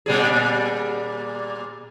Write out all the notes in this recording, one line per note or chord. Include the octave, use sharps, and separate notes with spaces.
A#2 G3 G#4